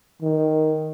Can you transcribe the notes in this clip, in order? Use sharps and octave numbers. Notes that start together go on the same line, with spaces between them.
D#3